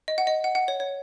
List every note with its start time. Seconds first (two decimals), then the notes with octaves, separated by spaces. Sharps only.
0.08 D#5
0.18 F#5
0.27 D#5
0.44 F#5
0.55 F#5
0.68 C#5
0.80 C#5